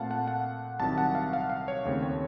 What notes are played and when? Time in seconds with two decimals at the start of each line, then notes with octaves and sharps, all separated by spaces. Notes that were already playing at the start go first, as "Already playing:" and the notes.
Already playing: A#2 A3 C4 F5 F#5 A5
0.11 F#5
0.28 F#5
0.80 C2 C3 D#3 F#3 A5
0.98 F#5
1.15 F5
1.33 F5
1.50 F5
1.68 C#5
1.85 D#2 C#3 A3 C4
2.02 C#5